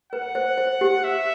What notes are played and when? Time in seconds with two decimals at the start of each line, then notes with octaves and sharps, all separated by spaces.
0.13 B4 F#5
0.35 C5
0.58 C5
0.81 G4
1.04 E5